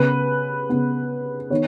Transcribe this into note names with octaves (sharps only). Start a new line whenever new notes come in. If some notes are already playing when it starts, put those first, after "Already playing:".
Already playing: C#3 B3 B4
C#3 B3
D#3 B3 C#5